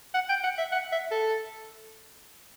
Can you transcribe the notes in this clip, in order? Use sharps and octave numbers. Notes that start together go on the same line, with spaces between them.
F#5
G5
F#5
E5
F#5
E5
A4